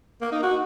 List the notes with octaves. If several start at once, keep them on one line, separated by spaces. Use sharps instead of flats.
A#3
D#4
F#4